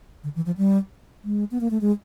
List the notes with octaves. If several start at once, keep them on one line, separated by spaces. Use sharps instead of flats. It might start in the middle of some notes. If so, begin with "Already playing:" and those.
D3
E3
F3
G3
G#3
B3
A#3
A3
G#3